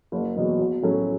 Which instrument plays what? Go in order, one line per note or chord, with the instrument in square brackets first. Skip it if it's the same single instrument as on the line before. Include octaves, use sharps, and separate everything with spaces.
[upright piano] F#1
E2 B2 F#3
B1
A2 F#3 A3 C#4